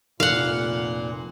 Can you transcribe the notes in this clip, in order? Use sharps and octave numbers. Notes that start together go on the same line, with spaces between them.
F1 A#2 F5 F#5